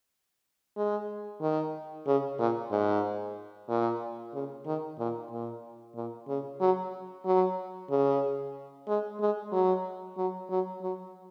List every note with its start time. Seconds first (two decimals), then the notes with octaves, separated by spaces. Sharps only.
0.77 G#3
1.41 D#3
2.07 C#3
2.39 A#2
2.71 G#2
3.69 A#2
4.33 C#3
4.66 D#3
4.99 A#2
5.31 A#2
5.95 A#2
6.28 C#3
6.61 F#3
7.25 F#3
7.91 C#3
8.88 G#3
9.20 G#3
9.52 F#3
10.17 F#3
10.50 F#3
10.82 F#3